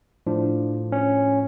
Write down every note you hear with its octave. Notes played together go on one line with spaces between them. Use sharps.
A2 F3 D4
C#4